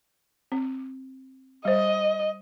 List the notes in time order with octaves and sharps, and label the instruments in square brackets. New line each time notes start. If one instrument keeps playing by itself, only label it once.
[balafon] C4
[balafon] G3 C5 [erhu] D#5